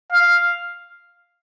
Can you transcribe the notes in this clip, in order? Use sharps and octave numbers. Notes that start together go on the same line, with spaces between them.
F5